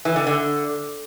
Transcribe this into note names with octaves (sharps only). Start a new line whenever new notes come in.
E3
D3
D3